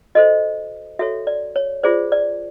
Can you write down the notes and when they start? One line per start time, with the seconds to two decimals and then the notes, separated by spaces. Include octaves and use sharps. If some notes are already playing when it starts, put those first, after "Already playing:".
0.15 F#4 A4 C5 D#5
0.99 F#4 A4 C#5 E5
1.27 D5
1.56 C#5
1.83 F4 G#4 C5 D5
2.12 D5